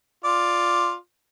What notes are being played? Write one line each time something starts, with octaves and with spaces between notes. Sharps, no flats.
F4 D5